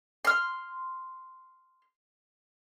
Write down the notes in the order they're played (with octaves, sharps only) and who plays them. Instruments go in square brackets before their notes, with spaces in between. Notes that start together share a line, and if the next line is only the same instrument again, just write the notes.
[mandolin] C6 F6